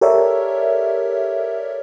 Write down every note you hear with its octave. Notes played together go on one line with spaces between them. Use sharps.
G4 A4 A#4 C#5 D5 E5